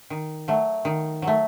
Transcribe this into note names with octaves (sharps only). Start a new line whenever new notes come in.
D#3
F#3 A3
D#3
F#3
A3